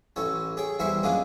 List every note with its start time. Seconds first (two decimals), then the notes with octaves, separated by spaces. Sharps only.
0.16 A1 A2 A4 C#5
0.57 G#4 C#5 G5
0.79 E2 G3 E4 C5 E5 C#6
1.03 F#2 A#2 G#3 A#3 D4 G#5